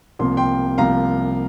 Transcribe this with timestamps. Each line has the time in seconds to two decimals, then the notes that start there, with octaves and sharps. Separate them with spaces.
0.19 C2 C3 F3 A#3 C6
0.37 G5 C6
0.78 C2 C3 F3 A#3 F5 A#5